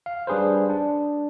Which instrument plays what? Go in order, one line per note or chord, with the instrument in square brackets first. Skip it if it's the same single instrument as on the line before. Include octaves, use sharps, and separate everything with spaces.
[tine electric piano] F5
G3 D4 G#4 B4 C5
D4